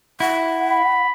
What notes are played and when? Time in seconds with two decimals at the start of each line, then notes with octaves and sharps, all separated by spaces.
0.20 E4 F#5
0.71 B5